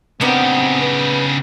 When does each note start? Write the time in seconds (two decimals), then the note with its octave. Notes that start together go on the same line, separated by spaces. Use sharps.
0.21 C#3 B3 C4 D4 D#4 G4
0.81 B4